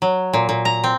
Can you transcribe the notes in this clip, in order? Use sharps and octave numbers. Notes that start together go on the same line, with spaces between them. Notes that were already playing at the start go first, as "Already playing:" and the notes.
F#3
A#2
A#2
A#5
C4